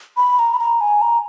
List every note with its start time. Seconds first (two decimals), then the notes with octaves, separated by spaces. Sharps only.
0.17 B5
0.39 A#5
0.54 B5
0.59 A#5
0.81 G#5
1.02 A#5